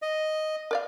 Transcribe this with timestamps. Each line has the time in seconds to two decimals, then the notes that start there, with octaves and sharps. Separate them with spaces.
0.02 D#5
0.71 A#4 D5 F5